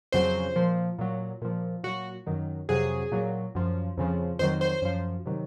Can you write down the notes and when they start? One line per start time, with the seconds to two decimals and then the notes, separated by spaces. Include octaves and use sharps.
0.12 F2 C#3 F#3 C5
0.56 A#2 F3
0.99 A#2 F#3
1.42 A#2 F3
1.84 A#2 F#3 F#4
2.27 F#2 D#3 F#3
2.69 F2 C3 F#3 G#4
3.12 A#2 F#3
3.55 F#2 F3
3.98 F2 C#3 F3
4.39 F2 D#3 F#3 C5
4.61 C5
4.82 F#2 F3
5.26 C3 D#3 F#3